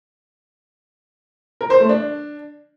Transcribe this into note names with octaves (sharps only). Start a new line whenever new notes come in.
A#4
C5
A3
D4